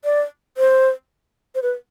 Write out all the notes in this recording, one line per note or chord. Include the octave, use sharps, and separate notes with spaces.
D5
C5
C5
B4